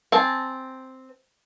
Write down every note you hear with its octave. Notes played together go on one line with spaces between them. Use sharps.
C4 G#5 A5